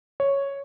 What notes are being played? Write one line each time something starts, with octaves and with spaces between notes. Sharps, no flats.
C#5